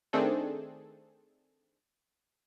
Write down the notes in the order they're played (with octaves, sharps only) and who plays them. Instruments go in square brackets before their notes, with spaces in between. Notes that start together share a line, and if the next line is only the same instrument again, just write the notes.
[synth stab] D#3 A3 C4 D4 G#4 A4